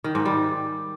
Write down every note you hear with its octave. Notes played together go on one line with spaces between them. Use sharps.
D#3
G#2
G3